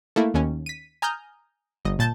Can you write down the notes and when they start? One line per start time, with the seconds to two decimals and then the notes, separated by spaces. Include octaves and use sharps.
0.16 A3 A#3 E4
0.34 D#2 C#4
0.66 B6 D#7
1.02 G#5 A#5 D#6 F6 G6
1.85 G1 D#5
1.99 A#2 A5 G6 A6